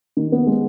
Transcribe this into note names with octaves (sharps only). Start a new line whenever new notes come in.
D#3
B3
G#3